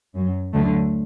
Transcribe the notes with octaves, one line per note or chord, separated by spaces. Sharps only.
F#2 F#3
D2 D3 F#3 A3